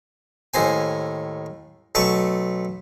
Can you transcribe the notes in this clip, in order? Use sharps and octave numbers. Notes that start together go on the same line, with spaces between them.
D#2 A2 C5 G#5
B1 A3 A5 C#6